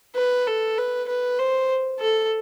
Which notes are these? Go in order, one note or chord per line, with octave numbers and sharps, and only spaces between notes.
B4
A4
B4
B4
C5
A4